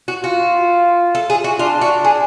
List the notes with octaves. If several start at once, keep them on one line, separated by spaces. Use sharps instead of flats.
F#4
F4 F#4
A4
G#4
F#4
D4 F4
F#4
G#4